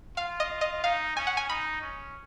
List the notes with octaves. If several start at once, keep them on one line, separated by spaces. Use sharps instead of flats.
F4 F5
D#5
D#5
D#4 F5
C#4 G#5
F#5
G#5
D#4 B5
C#4